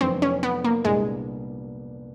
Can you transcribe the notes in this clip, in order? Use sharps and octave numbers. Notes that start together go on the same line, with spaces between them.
F1 F2 D3 F#3 B3 C4
C#4
B3
A#3
C2 A#2 G3 G#3 B3 D4